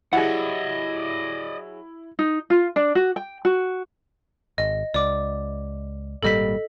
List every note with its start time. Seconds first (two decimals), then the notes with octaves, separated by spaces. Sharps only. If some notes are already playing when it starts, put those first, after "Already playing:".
0.13 F#3 E4 G4 G#4 D5 D#5 F#5
2.19 D#4
2.50 F4
2.76 D4
2.95 F#4
3.16 G5
3.45 F#4
4.58 G#1 D#5
4.94 C#2 D5 D6
6.23 G#1 A#2 G3 A4 D#5 B6